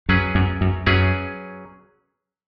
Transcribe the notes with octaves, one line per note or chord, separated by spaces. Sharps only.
F#2 F#3 C#4 G#4 B4
F#2
F#2
F#2 F#3 C#4 G#4 B4